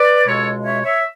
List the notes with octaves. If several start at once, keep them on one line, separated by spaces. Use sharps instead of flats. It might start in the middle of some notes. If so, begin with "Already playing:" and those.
Already playing: B4 D5
C#2 B2 G#3 A4 C#5
C#5 E5
C#5 E5